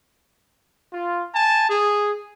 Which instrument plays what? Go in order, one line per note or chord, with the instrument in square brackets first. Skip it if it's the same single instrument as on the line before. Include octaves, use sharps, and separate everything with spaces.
[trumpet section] F4
G#5 A5
G#4